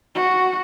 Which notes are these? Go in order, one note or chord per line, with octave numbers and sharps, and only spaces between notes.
F#4